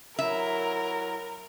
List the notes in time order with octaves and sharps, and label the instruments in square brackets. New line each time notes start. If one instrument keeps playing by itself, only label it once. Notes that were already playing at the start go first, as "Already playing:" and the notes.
[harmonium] F#3 E4 [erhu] A#4 [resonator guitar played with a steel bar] E5